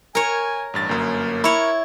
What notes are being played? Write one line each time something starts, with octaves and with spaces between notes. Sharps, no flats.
A#4 C#5 G#5
A1 G2 A6
G1 F#2 A#3
E4 A#4 C#5 B5 C#6